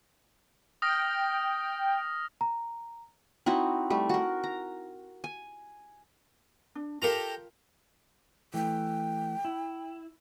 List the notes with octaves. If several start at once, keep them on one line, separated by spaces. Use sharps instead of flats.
G5 D#6 F6 A#6
A#5
C4 D#4 E4 F#4
G3 A3
F#4 A#4
A#5
G#5
D4
F4 G4 A4 A#4 F5 A#5
E3 A3 G5
E4